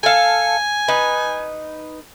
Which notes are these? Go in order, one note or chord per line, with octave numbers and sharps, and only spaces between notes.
A4 F5 G#5
D#4 B4